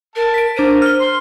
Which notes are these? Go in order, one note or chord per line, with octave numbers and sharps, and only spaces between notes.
A#4 A5
B6 D7
D4 A#4 C5 D#7
F6 G7
C6